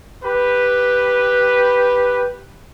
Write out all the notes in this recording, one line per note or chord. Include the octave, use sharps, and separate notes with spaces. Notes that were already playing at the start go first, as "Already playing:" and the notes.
G4 B4